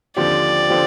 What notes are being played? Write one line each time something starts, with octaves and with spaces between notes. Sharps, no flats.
D#2 D3 F3 C4 G4 D5
D3 F3 C4 G4